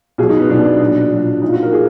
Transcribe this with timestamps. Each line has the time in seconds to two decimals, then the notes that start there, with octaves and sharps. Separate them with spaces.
0.18 B2 G#4
0.22 F#3
0.29 D#4
0.39 B3
0.49 B2 F#3 D4
0.64 D4
0.80 A#2 F#3
1.12 A#2 F#3
1.42 A#2 F3 D#4
1.52 F#4
1.62 A#4
1.72 F3 G#4